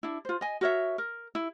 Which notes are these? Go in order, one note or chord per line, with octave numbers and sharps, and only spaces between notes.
D4 E4
F4 C5
D#5 G#5
F#4 A#4 C#5 E5
A#4
E4